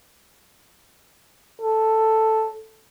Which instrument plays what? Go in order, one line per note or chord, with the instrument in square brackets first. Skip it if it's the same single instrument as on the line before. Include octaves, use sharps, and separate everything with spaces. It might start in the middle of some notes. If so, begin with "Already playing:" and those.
[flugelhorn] A4